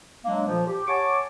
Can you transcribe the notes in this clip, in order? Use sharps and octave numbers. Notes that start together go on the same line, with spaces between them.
F#3 G#3 A#3 D4
A#2 D3 F3
G4
C#5 F#5 G#5 A5 C#6 D6